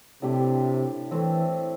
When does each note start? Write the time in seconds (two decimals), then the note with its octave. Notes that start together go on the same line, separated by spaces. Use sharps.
0.22 A2 C3 A3 D4 G4
1.11 A2 E3 A3 C4